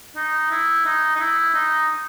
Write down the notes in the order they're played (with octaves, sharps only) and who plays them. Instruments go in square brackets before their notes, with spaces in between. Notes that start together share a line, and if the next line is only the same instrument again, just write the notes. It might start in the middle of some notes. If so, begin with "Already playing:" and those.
[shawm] D#4
E4
D#4
D#4
E4
D#4